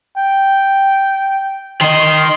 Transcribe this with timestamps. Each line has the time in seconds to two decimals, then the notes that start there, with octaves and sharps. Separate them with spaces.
0.17 G5
1.82 D#3 D#5 C6